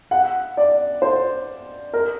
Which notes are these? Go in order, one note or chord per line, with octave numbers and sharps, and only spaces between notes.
F#5
D5
C5
A#4